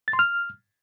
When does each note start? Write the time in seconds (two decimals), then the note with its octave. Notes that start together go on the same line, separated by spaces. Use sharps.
0.08 A6
0.13 C6
0.19 F6